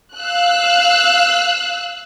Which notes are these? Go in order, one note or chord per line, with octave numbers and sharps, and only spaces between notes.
F5 E6 F#6